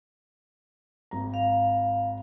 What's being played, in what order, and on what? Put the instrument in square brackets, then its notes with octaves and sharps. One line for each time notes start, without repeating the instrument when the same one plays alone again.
[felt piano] G#1 A#5
[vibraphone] F5